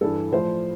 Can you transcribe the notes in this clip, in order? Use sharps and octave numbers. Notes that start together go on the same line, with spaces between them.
G2 E3 A4
A2 F3 C5